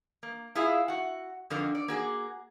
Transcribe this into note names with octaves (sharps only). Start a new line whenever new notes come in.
A#3
E4 F4 G#4 E5 F5
F#4 F#5
F2 D3 A#4
D5
A#3 F#4 G#4